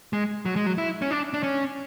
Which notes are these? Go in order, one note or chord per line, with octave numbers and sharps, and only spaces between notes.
G#3
F#3
G#3
F#3
E4
C#4
D4
D4
C#4